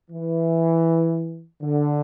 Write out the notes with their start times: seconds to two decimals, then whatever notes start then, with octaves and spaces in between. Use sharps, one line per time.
0.10 E3
1.62 D3